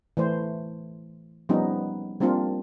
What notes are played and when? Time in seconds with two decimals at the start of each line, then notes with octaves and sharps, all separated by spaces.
0.17 E3 A3 C5
1.49 F3 G3 B3 C#4 D#4
2.20 G3 A#3 C4 D4 F4